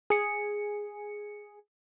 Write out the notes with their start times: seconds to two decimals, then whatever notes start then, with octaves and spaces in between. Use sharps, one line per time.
0.10 G#4 C#7